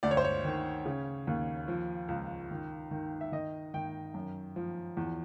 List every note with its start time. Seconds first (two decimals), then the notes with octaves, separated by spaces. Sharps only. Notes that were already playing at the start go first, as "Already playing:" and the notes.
0.03 D2 D5
0.11 C#5
0.17 C5
0.24 C#5
0.45 D#3
0.86 C#3
1.27 D#2
1.68 F3
2.08 C#2
2.51 D#3
2.91 D#3
3.21 E5
3.32 D#3 D#5
3.74 D#3 G5
4.14 F#2
4.56 F3
4.97 E2